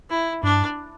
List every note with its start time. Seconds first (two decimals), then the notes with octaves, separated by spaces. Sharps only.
0.10 E4
0.43 G2 D4